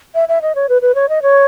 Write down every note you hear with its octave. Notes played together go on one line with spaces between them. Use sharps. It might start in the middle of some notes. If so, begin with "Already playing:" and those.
E5
E5
D#5
C#5
B4
B4
C#5
D#5
C#5